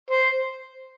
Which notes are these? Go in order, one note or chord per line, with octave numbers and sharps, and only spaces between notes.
C5